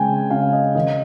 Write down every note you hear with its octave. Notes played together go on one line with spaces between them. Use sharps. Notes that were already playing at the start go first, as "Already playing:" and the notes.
Already playing: C#3 G#3 C4 G5 G#5
C#3 F5
D#5
D#3 D#5